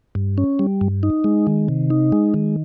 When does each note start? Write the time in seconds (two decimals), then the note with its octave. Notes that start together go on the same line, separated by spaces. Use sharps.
0.15 G2
0.38 C#4
0.59 G3
0.81 G2
1.03 D#4
1.24 G#3
1.47 D#3
1.69 C3
1.90 D#4
2.12 G#3
2.34 D#3